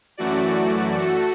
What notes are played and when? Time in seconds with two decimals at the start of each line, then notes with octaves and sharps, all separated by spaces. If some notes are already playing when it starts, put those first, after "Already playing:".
0.17 F#2 E3 A3 F#4 D5
0.98 A3 F#4 A4